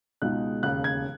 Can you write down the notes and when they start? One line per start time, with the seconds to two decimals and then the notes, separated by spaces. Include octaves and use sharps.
0.22 C#2 B2 G#3 D#4 F#6
0.63 E1 D#2 C#3 F#6
0.84 G#6